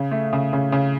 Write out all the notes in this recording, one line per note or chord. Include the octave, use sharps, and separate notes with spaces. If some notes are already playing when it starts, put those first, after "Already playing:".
Already playing: C#3
A3
C#3
C#3
C#3